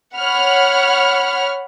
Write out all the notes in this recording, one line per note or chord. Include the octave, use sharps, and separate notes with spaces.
C#5 F#5 B5 F6